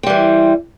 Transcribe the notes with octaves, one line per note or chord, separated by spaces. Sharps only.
E3 G3 C4